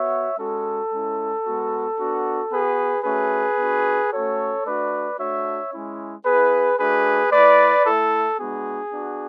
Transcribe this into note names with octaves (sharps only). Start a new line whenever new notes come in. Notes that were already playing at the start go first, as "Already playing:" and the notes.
Already playing: B3 F#4 C#5 E5
G#3 C#4 F#4 A4
G#3 C#4 E4
G#3 B3 F#4
B3 D4 F#4
B3 F#4 G#4 B4
A3 C#4 F#4 G#4 B4
B3 D4 F#4
A3 C#4 F#4 A4 C#5
A3 D4 F#4 B4 D5
A3 D4 F#4 C#5 E5
G#3 C#4 E4
B3 E4 G#4 B4
A3 D4 F#4 G#4 B4
A3 E4 B4 D5
A3 E4 A4
G#3 B3 D4 F#4 G#4
B3 D4 F#4